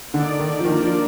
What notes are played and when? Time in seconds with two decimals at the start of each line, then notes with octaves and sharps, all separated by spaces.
0.14 D3 A#3 D#4 A4 D5
0.39 D#3
0.59 F3
0.65 D#3 A#3 D4 F4 A#4 D5
0.82 F3